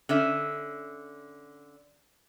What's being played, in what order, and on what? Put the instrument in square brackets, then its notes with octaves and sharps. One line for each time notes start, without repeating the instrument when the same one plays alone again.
[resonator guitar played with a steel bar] D3 C#4 E5